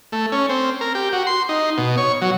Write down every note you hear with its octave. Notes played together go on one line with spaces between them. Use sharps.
A3
C#4
C4
A#4
G4
F#4
C6
D#4
B2
C#5
F#3